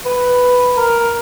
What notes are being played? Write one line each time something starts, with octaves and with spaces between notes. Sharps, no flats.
B4
A#4